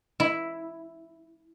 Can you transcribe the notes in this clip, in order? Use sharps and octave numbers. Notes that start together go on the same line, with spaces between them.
E4